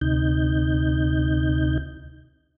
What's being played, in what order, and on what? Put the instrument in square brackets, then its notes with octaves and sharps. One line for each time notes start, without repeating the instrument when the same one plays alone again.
[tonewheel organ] D2 C3 D#4 G6